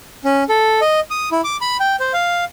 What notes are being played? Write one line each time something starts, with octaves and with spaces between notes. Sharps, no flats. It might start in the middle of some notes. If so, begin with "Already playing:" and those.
C#4
A4
D#5
D#6
E4
D6
B5
G5
C5
F5